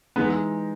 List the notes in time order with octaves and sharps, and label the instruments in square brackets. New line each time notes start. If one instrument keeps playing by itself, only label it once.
[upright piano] E3 G#3 D#4 [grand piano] B3 B4